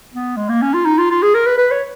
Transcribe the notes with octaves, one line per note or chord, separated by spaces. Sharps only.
B3
G#3
A#3
C#4
F4
D#4
F4
F4
G#4
A#4
B4
B4
C#5